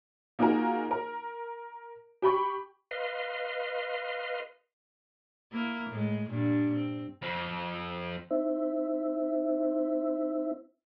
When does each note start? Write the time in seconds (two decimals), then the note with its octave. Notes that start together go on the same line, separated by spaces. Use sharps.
0.39 A#3 D#4 F4 F#4 G#4 A#4
0.91 A#4
2.22 G4 G5 B5 C#6
2.91 B4 D#5 F5 C6
5.52 A#3 E4 A#4
5.90 A2 G#3
6.30 G2 A#2 D4
6.75 C4
7.22 F2 F3
8.31 C4 D#4 E4 C5 E5